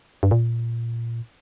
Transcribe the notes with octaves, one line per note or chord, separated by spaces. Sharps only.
G2
A#2